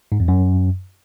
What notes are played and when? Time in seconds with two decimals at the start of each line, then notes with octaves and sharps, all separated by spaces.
0.12 G#2
0.20 F2
0.28 F#2